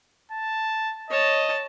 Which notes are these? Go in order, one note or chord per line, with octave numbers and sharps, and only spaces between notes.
A5
C#5 D#5 A5